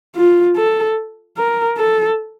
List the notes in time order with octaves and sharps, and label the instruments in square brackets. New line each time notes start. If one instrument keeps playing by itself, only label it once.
[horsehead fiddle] F4
A4
A#4
A4